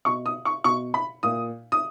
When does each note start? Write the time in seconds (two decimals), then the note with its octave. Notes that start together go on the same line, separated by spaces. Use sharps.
0.05 B2 C#6
0.26 D#6
0.45 C#6
0.64 B2 C#6
0.94 B5
1.23 A#2 D#6
1.72 D#6